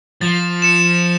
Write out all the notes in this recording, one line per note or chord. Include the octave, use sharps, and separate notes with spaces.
F3 A6
C#7 E7